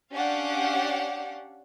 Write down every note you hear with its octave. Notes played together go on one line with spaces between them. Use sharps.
C#4 D4 G4 F5 F#5